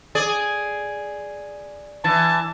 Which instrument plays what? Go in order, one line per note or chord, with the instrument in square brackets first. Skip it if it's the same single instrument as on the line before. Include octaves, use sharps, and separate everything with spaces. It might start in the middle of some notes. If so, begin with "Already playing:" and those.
[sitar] G#4 D5
[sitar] E3 [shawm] A5